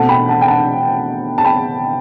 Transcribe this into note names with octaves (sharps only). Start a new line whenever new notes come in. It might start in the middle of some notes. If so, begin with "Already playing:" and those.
Already playing: B2 A3 C4 F#5 A5
G5 B5
F#5 A5
G5
F#5 A5
A5
G5 B5